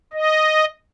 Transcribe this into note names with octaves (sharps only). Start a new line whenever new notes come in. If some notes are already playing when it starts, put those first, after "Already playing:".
D#5